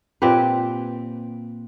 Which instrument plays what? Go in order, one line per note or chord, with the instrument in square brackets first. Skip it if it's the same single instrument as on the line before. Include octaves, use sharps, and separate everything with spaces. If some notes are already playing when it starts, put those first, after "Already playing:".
[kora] A#2 C4 G4 B4